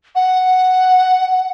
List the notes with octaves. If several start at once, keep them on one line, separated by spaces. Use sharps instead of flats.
F#5